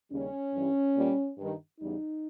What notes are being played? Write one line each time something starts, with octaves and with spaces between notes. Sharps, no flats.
D#2 C#3 G3 C#4
G2 E3 G3
A#2 G3
G2 D#3 G3
E2 C#3 G3 D#4